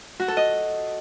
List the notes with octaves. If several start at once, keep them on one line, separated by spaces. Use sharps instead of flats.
F#4
A4
D#5